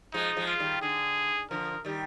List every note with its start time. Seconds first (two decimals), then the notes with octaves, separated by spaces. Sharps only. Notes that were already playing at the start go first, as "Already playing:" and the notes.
0.13 F3 G#3 D#4
0.36 F3 G#3
0.48 F4
0.60 D#3 G3
0.82 D3 G#4
1.51 D3 F3 A#4
1.85 D#3 G3